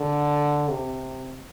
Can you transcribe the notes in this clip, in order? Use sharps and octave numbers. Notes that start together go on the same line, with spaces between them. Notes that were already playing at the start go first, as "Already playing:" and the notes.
Already playing: D3
C3